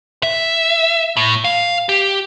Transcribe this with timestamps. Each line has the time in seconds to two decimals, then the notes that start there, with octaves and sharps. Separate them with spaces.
0.23 E5
1.17 A2
1.44 F5
1.89 G4